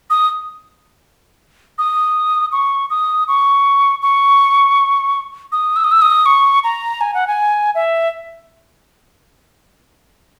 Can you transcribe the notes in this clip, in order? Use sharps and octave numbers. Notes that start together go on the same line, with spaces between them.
D#6
D#6
C#6
D#6
C#6
C#6
D#6
E6
D#6
E6
D#6
C#6
A#5
G#5
F#5
G#5
E5